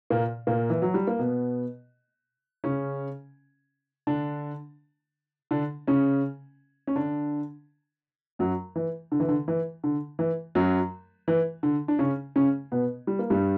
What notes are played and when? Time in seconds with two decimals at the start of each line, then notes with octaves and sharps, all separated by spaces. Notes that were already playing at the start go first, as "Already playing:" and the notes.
0.10 A#2 A#3
0.47 A#2 A#3
0.70 E3
0.82 F#3
0.94 G3
1.07 A#3
1.19 B2 B3
2.64 C#3 C#4
4.07 D3 D4
5.51 D3 D4
5.87 C#3 C#4
6.87 C#4
6.95 D3 D4
8.39 F#2 F#3
8.76 E3
9.12 D3
9.20 E3
9.28 D3
9.48 E3
9.84 D3
10.19 E3
10.55 F#2 F#3
11.28 E3
11.63 D3
11.88 D4
11.99 C#3 C#4
12.36 C#3 C#4
12.72 B2 B3
13.07 G3
13.19 A#3
13.30 G2 G3